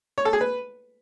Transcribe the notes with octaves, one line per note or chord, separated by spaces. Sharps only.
C#5
A4
G#4
B4